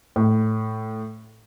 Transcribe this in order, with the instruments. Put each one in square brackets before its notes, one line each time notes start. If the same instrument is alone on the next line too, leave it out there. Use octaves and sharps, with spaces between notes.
[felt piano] A2